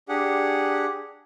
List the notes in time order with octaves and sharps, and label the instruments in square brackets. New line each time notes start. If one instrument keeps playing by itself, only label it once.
[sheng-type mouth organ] D4 G4 G#4 F#5